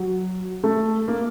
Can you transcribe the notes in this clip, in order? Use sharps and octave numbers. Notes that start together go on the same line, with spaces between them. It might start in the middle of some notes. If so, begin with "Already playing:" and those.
Already playing: F#3
A3
A#3